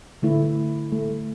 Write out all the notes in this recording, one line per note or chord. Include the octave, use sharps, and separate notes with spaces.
D3 A3 E4
A3